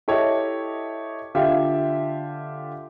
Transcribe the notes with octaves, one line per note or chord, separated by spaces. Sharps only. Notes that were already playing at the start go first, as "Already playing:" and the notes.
E4 G4 A4 C#5 D#5
D3 F4 G4 E5 F5